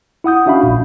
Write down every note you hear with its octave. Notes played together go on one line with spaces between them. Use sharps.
E4 F#5 D#6 G6
C#4 D4 F#4 E5 F5 B5
A#1 A#2